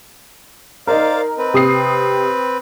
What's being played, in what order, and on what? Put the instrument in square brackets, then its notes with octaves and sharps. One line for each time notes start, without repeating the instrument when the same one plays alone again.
[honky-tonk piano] D#4 A#4 [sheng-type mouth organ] C5 D5 F5
[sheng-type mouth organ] C4 B4
[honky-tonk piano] C3 D#6 C7